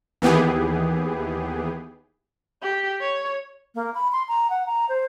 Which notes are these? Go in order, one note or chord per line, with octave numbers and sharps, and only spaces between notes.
D#2 E3 B3 G4 G#4
G4
C#5
A#3
B5
C6
A#5
F#5
A#5
C5